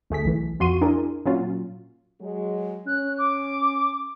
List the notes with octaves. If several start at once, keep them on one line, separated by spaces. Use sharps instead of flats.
D2 A3 G#4 B6
B1 E3
F2 F4 F#4 C6 C#6 D#7
D4 E4 G#4 A#4
A#2 F#3 C#4 F4
F#3 G#3
C#4 F#6
D6